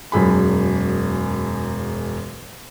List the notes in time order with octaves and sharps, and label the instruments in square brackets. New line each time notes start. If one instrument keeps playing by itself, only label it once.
[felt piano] E1 F#2 G#4 B5